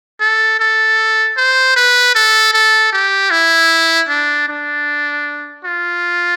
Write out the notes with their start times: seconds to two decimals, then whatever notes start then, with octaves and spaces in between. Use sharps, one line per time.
0.20 A4
0.59 A4
1.37 C5
1.76 B4
2.15 A4
2.53 A4
2.92 G4
3.31 E4
4.09 D4
4.48 D4
5.65 F4